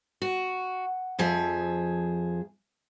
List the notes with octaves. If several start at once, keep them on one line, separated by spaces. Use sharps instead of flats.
F#4
F2 F3 G#4 E5